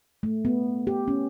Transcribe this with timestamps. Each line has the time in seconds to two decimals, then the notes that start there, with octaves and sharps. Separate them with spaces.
0.23 A3
0.45 B3
0.87 G4
1.08 C#4